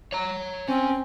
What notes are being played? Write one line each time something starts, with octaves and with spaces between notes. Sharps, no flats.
C#5 A#5
C4 C#4 G#5